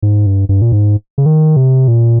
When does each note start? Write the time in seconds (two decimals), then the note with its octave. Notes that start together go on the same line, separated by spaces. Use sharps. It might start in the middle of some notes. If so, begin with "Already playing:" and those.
0.03 G#2
0.26 G2
0.49 G2
0.62 A#2
0.72 G#2
1.18 C#3
1.26 D#3
1.56 C3
1.88 A#2